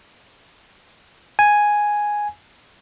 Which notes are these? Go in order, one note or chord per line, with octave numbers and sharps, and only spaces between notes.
G#5